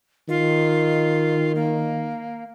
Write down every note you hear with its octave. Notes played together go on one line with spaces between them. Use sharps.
D#3 F4
A#3